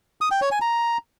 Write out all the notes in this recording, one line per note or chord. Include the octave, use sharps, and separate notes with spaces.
D#6
G5
C#5
G#5
A#5